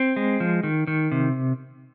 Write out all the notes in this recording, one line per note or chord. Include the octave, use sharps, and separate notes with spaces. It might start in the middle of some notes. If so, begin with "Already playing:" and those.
Already playing: C4
G#3
F3
D#3
D#3
C3